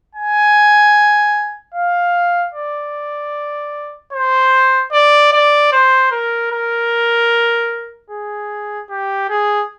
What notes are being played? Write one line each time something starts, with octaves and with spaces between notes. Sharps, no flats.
G#5
F5
D5
C5
D5
D5
C5
A#4
A#4
G#4
G4
G#4